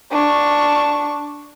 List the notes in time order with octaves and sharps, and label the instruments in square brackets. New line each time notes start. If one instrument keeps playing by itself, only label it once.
[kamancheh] D4 C#6